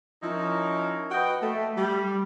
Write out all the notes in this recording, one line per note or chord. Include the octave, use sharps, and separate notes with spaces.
F3 C#4 D#4 E4 A#4 C#5
F#4 B4 D#5 G5
A3
G3